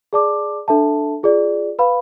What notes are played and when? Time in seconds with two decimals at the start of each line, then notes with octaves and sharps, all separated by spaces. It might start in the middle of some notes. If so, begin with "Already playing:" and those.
0.13 G#4 D5 A5 D6
0.68 D4 A4 E5 A5
1.23 F4 G#4 D5
1.79 B4 F5 B5